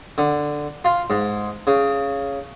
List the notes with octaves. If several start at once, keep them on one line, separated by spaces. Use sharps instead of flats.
D3
F4
G#2
C#3